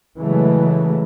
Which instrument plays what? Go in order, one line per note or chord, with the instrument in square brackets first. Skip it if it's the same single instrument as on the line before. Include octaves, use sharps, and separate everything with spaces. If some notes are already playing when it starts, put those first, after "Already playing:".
[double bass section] C#3 E3 F#3 G#3 A3